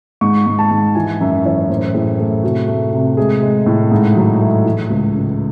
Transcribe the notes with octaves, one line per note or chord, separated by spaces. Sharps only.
G#2 C#6
G#2
A5
G#2
E3 G#5
F#2 E5
E3 C#5
A2 C5
A2 G#4
A3 G#4
C3 F#4
A3
C3
G#3 G#4
G#3
A2
G#2
F#3
A3
E3
C#2
C#3